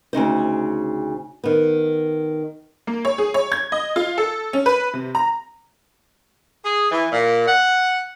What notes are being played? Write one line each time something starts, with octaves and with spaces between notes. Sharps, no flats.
D2 C#3 D#4 C5
D#3 B3
A#3
C#5
G#4
C#5
G#6
D#5
F4
A4
C#4
B4
C3
A#5
G#4
E3
A#2
F#5